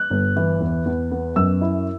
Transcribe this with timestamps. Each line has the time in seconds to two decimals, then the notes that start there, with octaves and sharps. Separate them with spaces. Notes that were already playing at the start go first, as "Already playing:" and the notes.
Already playing: F#6
0.10 G1
0.37 E3
0.60 E2
0.86 E2
1.11 B3
1.36 F#2 E6
1.61 E4